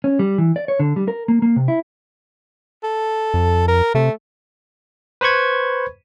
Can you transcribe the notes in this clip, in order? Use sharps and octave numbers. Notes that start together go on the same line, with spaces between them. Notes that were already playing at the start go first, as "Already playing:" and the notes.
C#4
G3
E3
D5
C#5
D3
G3
A#4
A#3
A#3
C3
E4
A4
F2
A#4
C3 A3
B4 C5 B5 C#6 G#6